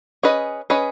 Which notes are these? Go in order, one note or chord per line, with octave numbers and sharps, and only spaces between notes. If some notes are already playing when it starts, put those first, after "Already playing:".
C#4 G#4 B4 D#5
C#4 G#4 B4 D#5